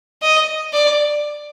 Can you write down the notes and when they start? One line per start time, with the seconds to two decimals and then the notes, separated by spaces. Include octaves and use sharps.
0.22 D#5
0.73 D5